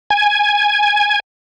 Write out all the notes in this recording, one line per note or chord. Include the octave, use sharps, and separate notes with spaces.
G#5